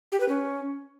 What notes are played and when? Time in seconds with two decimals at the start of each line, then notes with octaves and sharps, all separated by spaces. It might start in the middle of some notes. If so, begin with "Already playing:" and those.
0.12 G4
0.20 B4
0.29 C#4